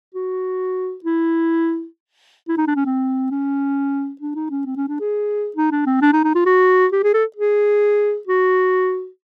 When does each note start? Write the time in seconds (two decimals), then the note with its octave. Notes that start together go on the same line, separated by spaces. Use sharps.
0.14 F#4
1.04 E4
2.48 E4
2.58 D#4
2.67 D4
2.76 C#4
2.86 C4
3.31 C#4
4.21 D4
4.35 D#4
4.51 C#4
4.66 C4
4.77 C#4
4.88 D4
5.00 G#4
5.56 D#4
5.71 D4
5.86 C4
6.02 D4
6.13 D#4
6.24 D#4
6.35 F4
6.46 F#4
6.92 G4
7.03 G#4
7.14 A4
7.36 G#4
8.27 F#4